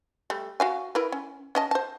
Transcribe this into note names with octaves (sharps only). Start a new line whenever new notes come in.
G3 A3
F#4 F5 G#5
E4 A#4 B4
C#4
C#4 D#5 A5
C5 A5